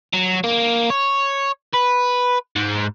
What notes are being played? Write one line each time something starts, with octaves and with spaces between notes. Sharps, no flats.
F#3
A#3
C#5
B4
G#2